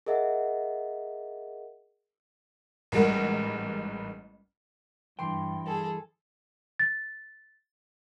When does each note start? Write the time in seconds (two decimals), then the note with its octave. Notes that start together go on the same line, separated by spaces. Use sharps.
0.06 G#4 A#4 D#5 E5 F#5
2.92 A1 G#2 G3 A#4 F#5
5.19 G2 E3 G5 C6
5.66 G#4 A4
6.79 A6